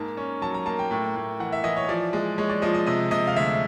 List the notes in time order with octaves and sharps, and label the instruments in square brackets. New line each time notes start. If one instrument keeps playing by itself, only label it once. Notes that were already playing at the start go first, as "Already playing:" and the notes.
Already playing: [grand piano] G#2 A#3 A5
C#4
F#3 A5
A#5
A#3 A5
G5
A2
A2
E3 F#5
E5
E3 D#5
C#5
F3 D5
G#3
G#3 C#5
D5
F3 D#5
D#5
C3 D#5
C3 D#5
F5
D2 E5